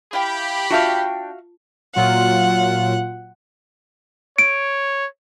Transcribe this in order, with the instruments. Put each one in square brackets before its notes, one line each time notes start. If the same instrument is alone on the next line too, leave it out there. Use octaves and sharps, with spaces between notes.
[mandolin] E4 F5 G5 [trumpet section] G4 B5
[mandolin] D4 G5 [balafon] F4 A5 C#6 [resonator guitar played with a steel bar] F#4 E5 F5
[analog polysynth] A#2 F#3 F4 [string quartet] F#5
[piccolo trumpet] C#5 [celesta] D7